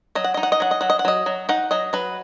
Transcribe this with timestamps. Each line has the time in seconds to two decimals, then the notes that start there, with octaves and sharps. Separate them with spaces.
0.15 F#3 D#5
0.24 F#5
0.34 D#4 D#5
0.43 F#5
0.52 D#5
0.60 F#3 F#5
0.71 D#5
0.81 F#3 F#5
0.90 D#5
0.99 F#5
1.05 F#3 D#5
1.26 F#3
1.49 D#4 F#5
1.71 F#3 D#5
1.93 F#3 B4